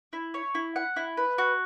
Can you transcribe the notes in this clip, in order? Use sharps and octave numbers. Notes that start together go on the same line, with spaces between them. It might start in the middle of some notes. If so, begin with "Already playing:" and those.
E4
C#5
E4
F#5
E4
B4
F#4